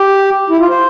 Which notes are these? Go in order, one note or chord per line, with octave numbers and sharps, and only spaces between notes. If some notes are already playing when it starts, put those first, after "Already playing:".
Already playing: G4
E4
F4
C5